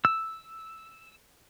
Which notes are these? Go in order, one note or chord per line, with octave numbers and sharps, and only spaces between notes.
E6